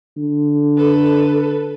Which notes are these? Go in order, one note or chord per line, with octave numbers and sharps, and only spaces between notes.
D3
A4 B4